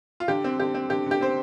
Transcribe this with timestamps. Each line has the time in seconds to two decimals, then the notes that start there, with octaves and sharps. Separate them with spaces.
0.20 F4
0.28 D3 G4
0.44 C4
0.59 D3 G4
0.75 C4
0.90 D3 G4
1.06 D3 G4
1.21 C4 C5